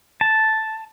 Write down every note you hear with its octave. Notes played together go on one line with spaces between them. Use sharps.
A5